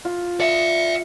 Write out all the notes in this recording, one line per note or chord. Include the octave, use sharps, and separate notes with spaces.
F4
D5 E5 C#7